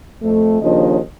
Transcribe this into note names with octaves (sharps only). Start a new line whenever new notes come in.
F2 A3
D#2 C#3 F3 D4 D#5